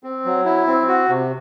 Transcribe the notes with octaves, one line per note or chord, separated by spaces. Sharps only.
C4
F#3
E4
C4
F#4
C3